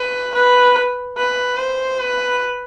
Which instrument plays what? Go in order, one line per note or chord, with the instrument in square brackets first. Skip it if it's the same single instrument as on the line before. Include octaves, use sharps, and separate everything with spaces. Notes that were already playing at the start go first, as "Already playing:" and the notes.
Already playing: [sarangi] B4
B4
B4
C5
B4